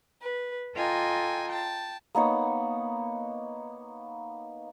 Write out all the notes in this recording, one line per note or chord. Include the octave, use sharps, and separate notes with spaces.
B4
F4 A4 D#5 G5 G#5 A#5
G5 A5
A#3 B3 D#4 C#5